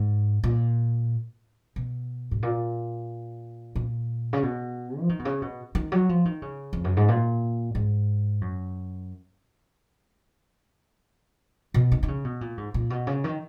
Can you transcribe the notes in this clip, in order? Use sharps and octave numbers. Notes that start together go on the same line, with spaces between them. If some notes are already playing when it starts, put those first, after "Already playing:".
Already playing: G#2
A#2
B2
G#2
A#2
A#2
C#3
B2
F3
D#3
B2
C#3
B2
D#3
F#3
F3
D#3
C#3
F2
F#2
G#2
A#2
G#2
F#2
B2
D#3
D#3
C#3
B2
A#2
G#2
A#2
B2
C#3
D#3